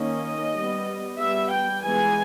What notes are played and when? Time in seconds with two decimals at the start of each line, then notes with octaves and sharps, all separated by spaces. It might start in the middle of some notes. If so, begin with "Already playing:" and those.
Already playing: D#3 A#3 C#4 D#5
0.56 G3 B3
1.19 G3 B3 E5
1.51 G5
1.83 E3 G#3 B3 G#5